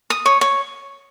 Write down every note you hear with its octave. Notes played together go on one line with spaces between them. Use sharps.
D#6
C#5
C#5